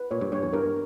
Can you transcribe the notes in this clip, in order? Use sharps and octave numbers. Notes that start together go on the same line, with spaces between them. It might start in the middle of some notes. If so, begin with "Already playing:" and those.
Already playing: B4
A#2 C#5
G2
G2 C#5
E2
G2 A#4